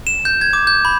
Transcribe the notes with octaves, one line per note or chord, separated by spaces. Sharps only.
E7
G6
G#6
D6
G6
B5